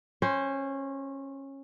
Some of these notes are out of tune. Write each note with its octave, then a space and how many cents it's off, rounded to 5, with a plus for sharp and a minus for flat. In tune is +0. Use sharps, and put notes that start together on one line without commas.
C#4 -20 C5 +0